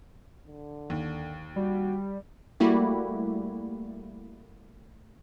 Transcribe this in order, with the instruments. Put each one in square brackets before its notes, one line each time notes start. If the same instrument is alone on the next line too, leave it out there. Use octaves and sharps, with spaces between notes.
[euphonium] D3
[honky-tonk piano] D#2
[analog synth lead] G3 [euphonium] F#4
[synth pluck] G3 A3 A#3 E4 F#4 G4